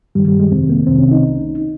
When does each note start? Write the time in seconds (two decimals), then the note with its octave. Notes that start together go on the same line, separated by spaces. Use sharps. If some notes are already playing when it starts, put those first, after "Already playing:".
0.15 G2 D#3 G3
0.28 G3
0.40 G#3
0.51 F2 C3 D#3 C4
0.69 A#3
0.87 C2 C3 D#3 C4
0.98 C#4
1.11 D#4